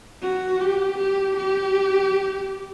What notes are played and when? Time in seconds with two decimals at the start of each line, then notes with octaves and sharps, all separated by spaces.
0.22 F#4
0.60 G4
0.98 G4
1.37 G4